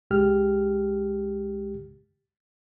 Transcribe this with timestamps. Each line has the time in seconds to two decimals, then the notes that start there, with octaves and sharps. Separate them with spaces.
0.11 C2 G#3 G4 F6